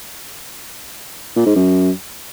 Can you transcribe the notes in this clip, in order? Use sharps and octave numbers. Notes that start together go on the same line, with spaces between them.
A#2
G#2
F#2